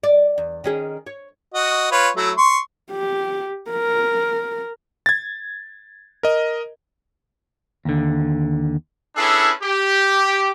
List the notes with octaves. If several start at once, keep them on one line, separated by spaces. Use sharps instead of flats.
D5
E2
D#3 C#4 G#4
C#5
F#4 D#5
F4 B4 C#5
F#3 A3 E4
C6 C#6
G4
A#4
G#6 A6
A#4 D#5
D#2 D3
C#4 D4 E4 G#4 A4 B4
G4